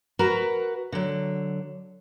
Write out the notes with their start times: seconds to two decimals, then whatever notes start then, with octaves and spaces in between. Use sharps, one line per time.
0.19 F#4 A#4 B4 A#5
0.92 D3 F#3